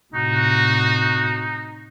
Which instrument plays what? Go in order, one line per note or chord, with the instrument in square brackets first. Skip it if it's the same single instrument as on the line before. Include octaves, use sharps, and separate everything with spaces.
[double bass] A2 C3 [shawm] D#4 [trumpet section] F#4